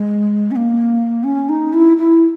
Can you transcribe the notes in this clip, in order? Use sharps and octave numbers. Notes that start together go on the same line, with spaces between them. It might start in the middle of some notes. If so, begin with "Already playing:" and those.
Already playing: G#3
C#4
A#3
C#4
D#4
E4
E4